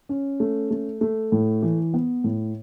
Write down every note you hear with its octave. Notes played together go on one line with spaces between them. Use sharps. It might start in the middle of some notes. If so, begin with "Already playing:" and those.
C#4
A3
A3
A3
A2
E3
B3
A2